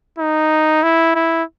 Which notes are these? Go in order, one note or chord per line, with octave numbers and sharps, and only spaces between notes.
D#4
E4
E4